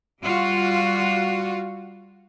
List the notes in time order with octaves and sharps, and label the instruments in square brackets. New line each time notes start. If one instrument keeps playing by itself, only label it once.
[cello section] G3 F4 F#4